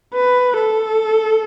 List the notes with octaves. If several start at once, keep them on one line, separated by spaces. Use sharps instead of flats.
B4
A4